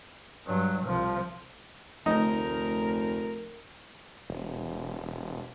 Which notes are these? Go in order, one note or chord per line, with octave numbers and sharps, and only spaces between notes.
G2 F#3
C2 F3
F1 D2 D#4 A#4
E1